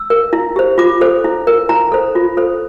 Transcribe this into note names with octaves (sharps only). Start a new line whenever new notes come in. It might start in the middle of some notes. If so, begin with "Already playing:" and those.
Already playing: E6
A#4
E4
G4 C5
F4 D6
A4 C5
E4
A#4
E4 A#5
A4 C5
F4
A4 C5